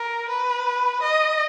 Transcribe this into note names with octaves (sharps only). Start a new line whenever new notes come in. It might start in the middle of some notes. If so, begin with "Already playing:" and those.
Already playing: A#4
B4
D#5